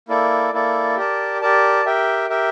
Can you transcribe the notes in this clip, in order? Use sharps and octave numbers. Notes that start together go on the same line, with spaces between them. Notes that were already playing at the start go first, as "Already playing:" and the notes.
A#3 E4 A4 D5
A#3 E4 A4 D5
G4 A#4 D5 A5
G4 A#4 D5 A5
G4 A#4 E5 G5
G4 A#4 E5 G5